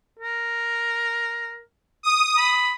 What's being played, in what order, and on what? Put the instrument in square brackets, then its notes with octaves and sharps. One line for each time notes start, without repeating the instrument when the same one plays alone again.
[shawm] A#4
[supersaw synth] D#6
[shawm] B5